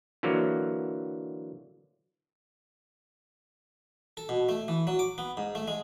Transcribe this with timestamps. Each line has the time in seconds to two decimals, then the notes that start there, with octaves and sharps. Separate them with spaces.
0.23 D3 E3 F#3 A#3
4.17 A4
4.29 B2
4.49 A3
4.68 E3
4.87 F#3
4.99 D6
5.18 B3
5.37 G#2
5.55 A3
5.68 G#3